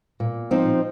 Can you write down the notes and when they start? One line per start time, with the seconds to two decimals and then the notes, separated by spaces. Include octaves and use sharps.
0.20 A#2
0.51 F3 C4 D#4